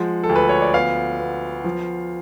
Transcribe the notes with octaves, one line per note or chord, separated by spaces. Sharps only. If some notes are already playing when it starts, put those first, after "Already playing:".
Already playing: F3 G#3 F#5
A4
D2
B4
C#5
D5
B3 F5
B3
F3